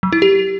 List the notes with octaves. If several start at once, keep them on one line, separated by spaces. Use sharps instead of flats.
F#3
E4
G4